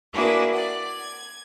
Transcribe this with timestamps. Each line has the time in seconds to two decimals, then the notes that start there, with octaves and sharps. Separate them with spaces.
0.12 A#3 D4 E4 F#4 G#4 B4
0.52 D5 F#5
0.86 G#6